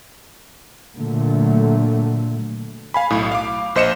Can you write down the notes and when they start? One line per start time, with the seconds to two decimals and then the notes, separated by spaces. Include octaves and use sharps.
0.97 A#2 D3 F#3 A3
2.94 F5 G#5 B5
3.10 B1 A2
3.32 F5 D6
3.75 A#1 C5 D#5 C#7 E7